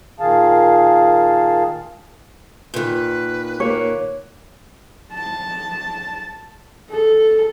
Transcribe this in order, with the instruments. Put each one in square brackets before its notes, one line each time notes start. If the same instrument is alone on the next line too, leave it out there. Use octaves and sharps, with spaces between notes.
[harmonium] A#2 D#3 G#4 F5 A5
[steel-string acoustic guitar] A#2 D#3 [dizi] B4
[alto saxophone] A#3 [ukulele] C#5
[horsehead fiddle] A5
A4